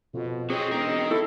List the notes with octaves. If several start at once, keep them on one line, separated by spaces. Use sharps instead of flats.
F2 B2
C4 F#4 G#4 C#5 D#5
E1 D#4 A#4
E4 A4